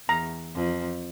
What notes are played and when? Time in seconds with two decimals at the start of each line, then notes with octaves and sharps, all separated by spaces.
0.09 E2 A#5
0.55 F2